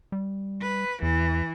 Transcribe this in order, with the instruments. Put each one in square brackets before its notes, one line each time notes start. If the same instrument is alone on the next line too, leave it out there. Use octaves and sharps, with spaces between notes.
[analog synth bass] G3
[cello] B4
[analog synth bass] E2 [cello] E3